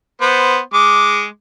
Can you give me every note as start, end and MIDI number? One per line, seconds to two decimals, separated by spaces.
0.21 0.58 59
0.21 0.58 72
0.74 1.25 56
0.74 1.25 86